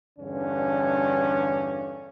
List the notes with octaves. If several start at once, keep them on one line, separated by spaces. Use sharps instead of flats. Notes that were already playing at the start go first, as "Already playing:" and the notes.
E2 G2 D3 C#4